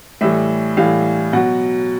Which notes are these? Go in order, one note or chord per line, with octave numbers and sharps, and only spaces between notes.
A2 E3 G3 E5
A2 E3 G3 F5
B2 F#3 F#5